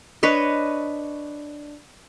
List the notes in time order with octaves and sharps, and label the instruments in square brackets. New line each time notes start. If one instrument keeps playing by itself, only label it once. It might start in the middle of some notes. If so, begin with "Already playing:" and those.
[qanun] D4 B4 C#5 D#5